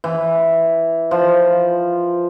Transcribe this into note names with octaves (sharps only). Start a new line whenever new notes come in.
E3
F3